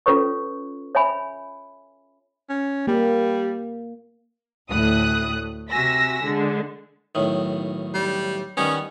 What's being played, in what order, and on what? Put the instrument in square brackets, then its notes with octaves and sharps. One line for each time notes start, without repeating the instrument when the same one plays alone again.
[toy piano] C#4 F4 A4 B4 C#5 C#6
C#5 E5 G#5 B5
[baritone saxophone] C#4
[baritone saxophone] G3 [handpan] A#3
[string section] D2 A2 D#6 F#6
C3 F#4 G#5 E6 A#6 B6
D3 G#3
[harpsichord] B1 A2 D#3
[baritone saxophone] G3
[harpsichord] D#3 G3 B3 [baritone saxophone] C#4